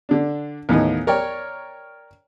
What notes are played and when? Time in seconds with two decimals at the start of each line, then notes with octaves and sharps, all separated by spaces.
0.09 D3 D4
0.69 D#2 A2 E3 B3 D#4
1.07 A#4 C#5 D5 G5